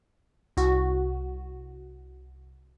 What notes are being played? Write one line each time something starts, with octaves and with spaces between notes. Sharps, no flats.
C2 F#4